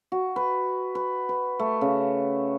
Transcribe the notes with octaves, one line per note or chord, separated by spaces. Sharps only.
F#4
B4
B4
B4
A3
C#3